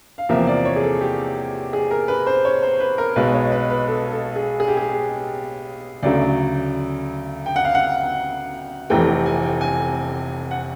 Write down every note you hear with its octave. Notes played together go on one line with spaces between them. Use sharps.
F5
E2 C3 F3 A#3 E5
D5
C#5
G#4
A4
G4
G#4
A#4
B4
C5
C#5
C5
B4
A#4
B1 B2 G#3 B4
C#5
B4
B4
A4
A4
G#4
G#4
G4
G#4
D2 C#3 F#3 A3 D5
G5
F#5
F5
F#5
F1 F2 C3 E3 A3 G5
G#5
G5
G#5
F#5